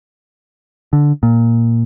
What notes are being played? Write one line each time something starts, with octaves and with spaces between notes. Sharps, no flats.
D3
A#2